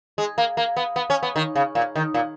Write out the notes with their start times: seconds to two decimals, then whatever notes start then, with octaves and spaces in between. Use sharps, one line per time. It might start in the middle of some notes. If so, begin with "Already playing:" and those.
0.18 G#3
0.38 A#3
0.57 A#3
0.77 B3
0.96 B3
1.10 C#4
1.23 B3
1.36 D#3
1.55 C#3
1.75 A#2
1.96 D#3
2.14 A#2